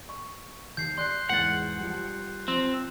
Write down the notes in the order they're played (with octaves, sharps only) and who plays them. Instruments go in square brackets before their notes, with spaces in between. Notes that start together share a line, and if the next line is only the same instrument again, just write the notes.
[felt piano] C#6
[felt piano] D#2 [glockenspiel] G6 C7
[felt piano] D5 C7 [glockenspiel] C6 F#6
[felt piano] E2 G#2 [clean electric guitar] F#5 [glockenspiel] F#6 A6
[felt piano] F3 G3
[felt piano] F3 [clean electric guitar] C4